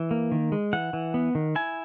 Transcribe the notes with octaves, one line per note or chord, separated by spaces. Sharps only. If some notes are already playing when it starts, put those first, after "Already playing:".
Already playing: E3
A#3
D#3
G#3
E3 F#5
E3
B3
D#3
E4 G#5